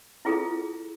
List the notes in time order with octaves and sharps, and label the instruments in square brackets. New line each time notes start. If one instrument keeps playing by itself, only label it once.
[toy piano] E4 F4 G#4 A4